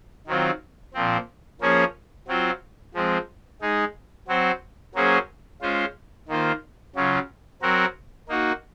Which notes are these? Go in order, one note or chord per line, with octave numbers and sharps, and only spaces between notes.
D#3 F#3 C4 F4
A#2 F3 C4
F3 A#3 C#4 G#4 C#5
F#3 C4 F4 C5
F3 G#3 C4
G#3 D#4 G#4
F#3 C4 F#4 C5
F#3 A#3 C#4 G#4 C5
G#3 C#4 F4 C5
D#3 A#3 F4 C5
C#3 F#3 C#4 F4
F#3 C4 F#4 A#4
A#3 D#4 F#4